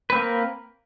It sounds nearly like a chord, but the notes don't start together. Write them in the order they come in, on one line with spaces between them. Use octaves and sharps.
B4 C4 A#3 A#4